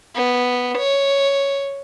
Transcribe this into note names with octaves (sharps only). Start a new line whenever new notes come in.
B3
C#5